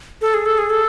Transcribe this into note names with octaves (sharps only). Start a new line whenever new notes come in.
A4
G#4
A4
G#4
A4